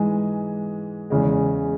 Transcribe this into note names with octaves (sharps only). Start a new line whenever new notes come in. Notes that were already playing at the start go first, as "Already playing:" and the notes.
Already playing: G#2 E3 G#3 G#5
E2 C#3 G#3